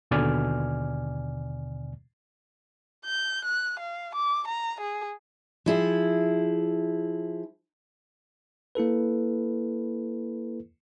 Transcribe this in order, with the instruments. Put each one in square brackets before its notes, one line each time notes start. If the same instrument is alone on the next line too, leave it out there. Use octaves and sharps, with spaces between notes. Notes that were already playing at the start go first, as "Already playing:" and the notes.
[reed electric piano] D#2 B2 D3 D5 G#5 F6
[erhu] G6
F#6
F5
D6
A#5
G#4
[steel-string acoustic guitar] F3 E4 G#4
[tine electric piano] A#3 E4 A4 B4